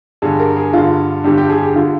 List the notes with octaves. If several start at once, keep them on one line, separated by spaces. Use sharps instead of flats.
G2 D3 G#4
A#4
G#4
G2 D3 F4
G2 D3 G4
G4
G#4
G4
D3 F4